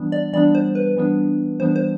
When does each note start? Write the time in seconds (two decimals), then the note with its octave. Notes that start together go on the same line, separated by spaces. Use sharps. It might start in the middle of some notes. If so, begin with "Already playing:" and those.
Already playing: E3 G3 B3 D4
0.12 D5
0.33 E3 G3 B3 D4 D5
0.55 C5
0.75 B4
0.96 E3 G3 B3 D4
1.60 E3 G3 B3 D4 C5
1.76 C5